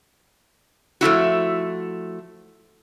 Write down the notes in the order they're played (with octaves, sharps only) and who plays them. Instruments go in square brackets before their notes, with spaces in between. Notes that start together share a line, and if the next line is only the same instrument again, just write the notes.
[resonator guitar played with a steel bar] F3 A3 E4 F#4